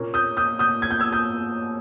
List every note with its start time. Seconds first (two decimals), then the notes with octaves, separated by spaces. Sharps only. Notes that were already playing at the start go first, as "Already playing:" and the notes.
Already playing: A#2 A#3 C#4
0.14 D#6 G6
0.37 D#6 G6
0.59 D#6 G6
0.82 G#6
0.91 G6
1.00 E6 G#6
1.12 D#6 G6